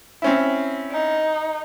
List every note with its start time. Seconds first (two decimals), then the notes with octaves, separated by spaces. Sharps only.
0.22 C4 C#4 E4
0.92 D#4